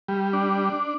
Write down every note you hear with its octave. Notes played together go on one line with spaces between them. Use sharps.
G3
D4